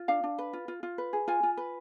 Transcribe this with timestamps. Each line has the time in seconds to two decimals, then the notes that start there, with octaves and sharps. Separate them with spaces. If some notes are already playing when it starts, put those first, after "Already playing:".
Already playing: F4
0.08 D4 F5
0.23 D4
0.38 B4
0.53 F4
0.68 F4
0.83 F4
0.98 B4
1.13 G#4
1.28 F4 G#5
1.43 F4
1.57 B4